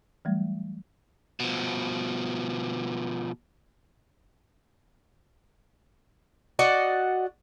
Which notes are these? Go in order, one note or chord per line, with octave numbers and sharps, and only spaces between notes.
E3 F#3 G3 A3
B2 F3
F#4 D5 D#5 F#5